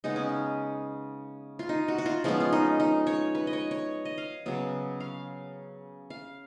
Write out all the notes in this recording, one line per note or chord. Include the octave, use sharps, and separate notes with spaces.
C#3 G#3 B3 D#4
C#4
D#4
F4
D#4
F#4
F#4
F4
F3 G#3 B3 C#4
F4
D#4
D#4
C#5
B4
D#5
C#5
C#5
D#5
F5
C#3 F#3 B3
F5
F5